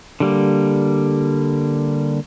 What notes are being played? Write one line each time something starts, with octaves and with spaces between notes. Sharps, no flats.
D3 G3 A#3